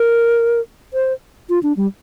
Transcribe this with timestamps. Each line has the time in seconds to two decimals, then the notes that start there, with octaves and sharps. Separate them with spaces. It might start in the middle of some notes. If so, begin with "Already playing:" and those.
Already playing: A#4
0.94 C5
1.49 F4
1.63 D4
1.77 G3